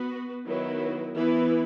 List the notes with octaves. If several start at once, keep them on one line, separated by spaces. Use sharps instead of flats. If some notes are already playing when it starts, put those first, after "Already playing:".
Already playing: B3 F#4 B4
D#3 F#3 B3 E4 B4
E3 B3 E4 B4